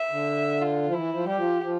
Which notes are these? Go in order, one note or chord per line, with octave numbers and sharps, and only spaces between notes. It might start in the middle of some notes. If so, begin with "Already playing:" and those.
Already playing: E5
D3
F4
F3
E3 E4
F3
G3 G4
F3
F3